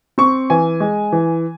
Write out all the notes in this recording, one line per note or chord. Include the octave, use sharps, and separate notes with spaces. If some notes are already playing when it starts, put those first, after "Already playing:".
C4 C#6
E3 G#5
G#3
E3